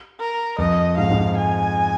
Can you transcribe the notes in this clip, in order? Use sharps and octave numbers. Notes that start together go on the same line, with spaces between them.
A#4
F2 D#5
G#2 F5
G#2
G#5